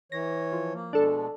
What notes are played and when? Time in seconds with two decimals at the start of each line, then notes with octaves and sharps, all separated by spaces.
0.12 E3 C#5 A#6
0.52 F3
0.74 A#3
0.93 B2 G#3 D4 A4